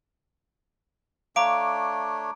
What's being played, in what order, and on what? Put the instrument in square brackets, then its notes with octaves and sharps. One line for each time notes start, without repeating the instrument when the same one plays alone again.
[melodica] A3 D4 C#5 [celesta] F5 [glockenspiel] A#5 D6 D7